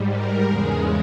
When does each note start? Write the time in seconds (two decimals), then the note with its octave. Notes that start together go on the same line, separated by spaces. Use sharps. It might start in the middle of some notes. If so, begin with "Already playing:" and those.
Already playing: G#2 G3
0.12 A#4
0.46 E2 C#3 G#3 G#4